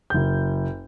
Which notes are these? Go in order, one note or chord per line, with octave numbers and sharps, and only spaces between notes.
F#1 G6